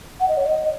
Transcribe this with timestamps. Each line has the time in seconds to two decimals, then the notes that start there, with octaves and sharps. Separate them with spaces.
0.20 F#5
0.28 D#5
0.37 C#5
0.46 D#5